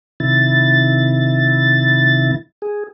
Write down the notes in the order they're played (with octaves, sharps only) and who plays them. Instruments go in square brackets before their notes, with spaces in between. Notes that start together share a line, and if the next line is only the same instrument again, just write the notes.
[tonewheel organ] C3 D#3 E4 A6
G#4